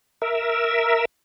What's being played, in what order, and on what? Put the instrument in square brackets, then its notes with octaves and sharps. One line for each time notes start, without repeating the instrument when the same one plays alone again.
[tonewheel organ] A#4 E5